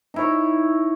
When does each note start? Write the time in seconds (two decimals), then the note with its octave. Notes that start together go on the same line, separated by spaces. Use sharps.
0.14 D#4 E4 C#5